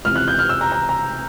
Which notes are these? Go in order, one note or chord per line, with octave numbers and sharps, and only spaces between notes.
C#2 C3 E3 F6
F#6
G6
F6
E6
A#5
A#5
A#5